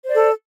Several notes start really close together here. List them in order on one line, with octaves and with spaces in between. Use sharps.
C5 D5 A4